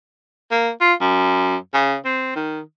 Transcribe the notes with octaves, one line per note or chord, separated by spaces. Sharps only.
A#3
F4
F#2
C#3
C4
D#3